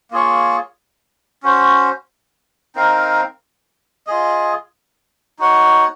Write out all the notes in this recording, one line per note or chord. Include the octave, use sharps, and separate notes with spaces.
A#3 F4 G#4 C#5
C#4 F#4 C5
C4 D#4 A#4 F5
F4 G#4 D#5
D#4 F#4 C#5 F#5